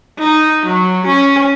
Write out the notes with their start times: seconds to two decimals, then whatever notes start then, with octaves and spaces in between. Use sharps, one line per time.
0.19 D#4
0.65 F#3
1.06 C#4